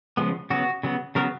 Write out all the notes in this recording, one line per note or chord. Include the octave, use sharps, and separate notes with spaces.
C#3 F3 G#3 B3
C#3 F#3 B3 F#4
C#3 F#3 B3
C#3 F#3 B3 A#4